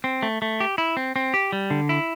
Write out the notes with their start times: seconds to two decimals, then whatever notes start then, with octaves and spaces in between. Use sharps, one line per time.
0.04 C4
0.23 A3
0.42 A3
0.60 G4
0.78 E4
0.97 C4
1.16 C4
1.34 G4
1.53 G3
1.71 D3
1.89 E4